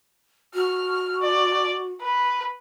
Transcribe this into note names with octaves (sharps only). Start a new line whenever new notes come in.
F#4 F6
D5
B4